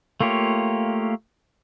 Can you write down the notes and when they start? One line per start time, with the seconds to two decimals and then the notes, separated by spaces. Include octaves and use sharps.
0.20 A3 A#3 F4 G4 C#5